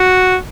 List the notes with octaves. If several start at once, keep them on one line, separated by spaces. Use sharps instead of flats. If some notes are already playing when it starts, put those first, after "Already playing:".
Already playing: F#4